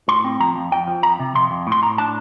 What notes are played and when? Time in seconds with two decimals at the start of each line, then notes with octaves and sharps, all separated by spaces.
0.08 A2 C6
0.24 C4
0.40 F3 A#5
0.56 F2
0.72 F2 G5
0.87 F3
1.03 F2 A#5
1.20 C3
1.35 F2 C6
1.51 F2
1.67 A2
1.72 C6
1.82 A2 A#5
1.98 D4 A5